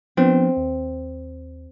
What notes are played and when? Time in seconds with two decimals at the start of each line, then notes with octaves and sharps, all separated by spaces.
0.17 F3 B3 C4 D4
0.57 D#2